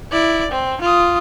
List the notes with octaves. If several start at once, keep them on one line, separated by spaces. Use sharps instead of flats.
E4 D5
C4
F4 D#6